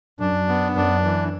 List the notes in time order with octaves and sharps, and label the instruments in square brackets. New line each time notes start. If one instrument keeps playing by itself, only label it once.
[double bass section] F#2 [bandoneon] D4
[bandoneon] B3
[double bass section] F#2 [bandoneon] D4
[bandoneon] E3